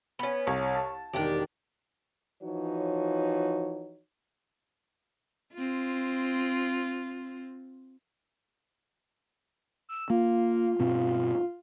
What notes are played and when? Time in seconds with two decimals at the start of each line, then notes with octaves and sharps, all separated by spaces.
0.19 B3 C#4
0.47 C2 C#5
0.75 A5
1.14 E1 D#3 D4 G4
2.42 E3 F3 D#4 F#4 C#5
5.54 C4 F4
9.89 E6
10.10 A#3 F4
10.79 G2 B2 C4